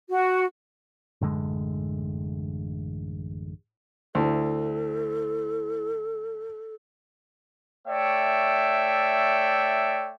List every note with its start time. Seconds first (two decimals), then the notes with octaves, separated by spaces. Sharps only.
0.10 F#4
1.21 A1 F#2 D3 G#3
4.15 D2 E4 A4 C5
7.87 A3 C#5 D5 E5 G5